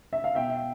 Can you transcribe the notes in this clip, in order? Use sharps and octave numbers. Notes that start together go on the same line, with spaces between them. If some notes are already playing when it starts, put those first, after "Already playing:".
E5
F5
B2 E5 G5